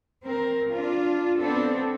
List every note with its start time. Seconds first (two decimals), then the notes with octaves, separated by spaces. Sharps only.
0.23 C4 A#4
0.72 D4 F4
1.40 B3 C4 D4 A4